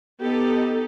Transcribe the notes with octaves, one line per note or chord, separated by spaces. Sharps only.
B3 D#4 G4 A4